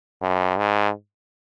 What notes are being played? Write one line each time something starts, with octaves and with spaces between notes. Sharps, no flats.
F#2
G#2